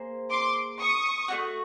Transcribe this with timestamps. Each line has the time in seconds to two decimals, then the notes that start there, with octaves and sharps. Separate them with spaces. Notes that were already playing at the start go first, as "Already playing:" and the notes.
Already playing: A#3 G#4 C5
0.31 C6 D6
0.80 C#6 D#6
1.28 A3 D4 F#4